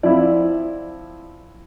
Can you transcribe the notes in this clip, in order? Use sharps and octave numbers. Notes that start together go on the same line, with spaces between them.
F3 C4 E4 D5